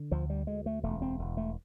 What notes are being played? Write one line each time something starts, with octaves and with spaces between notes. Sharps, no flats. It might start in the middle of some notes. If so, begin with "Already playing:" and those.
Already playing: D3
D2 F3
G3
D2 G#3
A3
E1 A3
C4
E1
A3